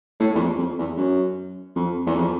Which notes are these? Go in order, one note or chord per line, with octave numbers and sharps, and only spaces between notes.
A2
E2
F2
F2
E2
F#2
F2
E2
F2